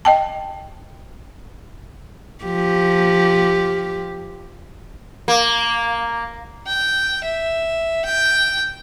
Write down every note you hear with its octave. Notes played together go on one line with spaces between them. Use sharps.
D#5 G5 A5
F3 G4
A#3
G5
E5
G5